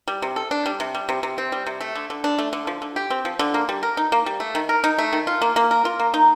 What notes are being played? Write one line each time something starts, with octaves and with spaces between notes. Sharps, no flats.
G3
C3
A4
D4
G3
C3
G3
C3
C3
C4
G3
C3
A3
D3
D3
D4
A3
D3
F3
D3
G4
C4
F3
D3
A#3
G3
A#4
D#4
A#3
G3
A3
D#3
A#4
D#4
A3
D#3
F4
A#3
A#3
A#4
F4
A#3
D#4